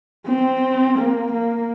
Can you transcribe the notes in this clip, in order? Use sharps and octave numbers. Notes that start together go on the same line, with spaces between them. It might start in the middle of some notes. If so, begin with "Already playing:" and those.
C4
A#3
A#3